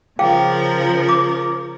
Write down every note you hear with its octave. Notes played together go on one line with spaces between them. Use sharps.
C#3 F3 G#4 A#4 F5 G5
D6